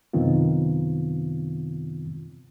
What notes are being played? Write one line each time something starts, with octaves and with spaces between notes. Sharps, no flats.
F#2 C3 D#3 B3 C4 F4